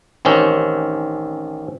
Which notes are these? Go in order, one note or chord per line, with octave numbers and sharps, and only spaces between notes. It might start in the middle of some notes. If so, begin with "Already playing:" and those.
A1 D#3 C4 C#4 G4